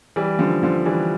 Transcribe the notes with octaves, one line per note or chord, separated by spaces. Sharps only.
E3 G3
D3 F3
D3 F3
E3 G3